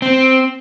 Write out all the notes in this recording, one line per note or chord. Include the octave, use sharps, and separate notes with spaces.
C4